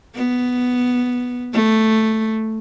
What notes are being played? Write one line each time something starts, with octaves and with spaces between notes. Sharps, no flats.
B3
A3